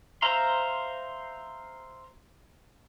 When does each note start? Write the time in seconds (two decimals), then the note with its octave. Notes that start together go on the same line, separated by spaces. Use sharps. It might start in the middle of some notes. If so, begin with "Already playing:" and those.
0.22 C5 E5 F5 A#5 C6